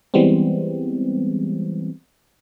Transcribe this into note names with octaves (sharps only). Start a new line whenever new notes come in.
E3 G3 G#3 B3 C4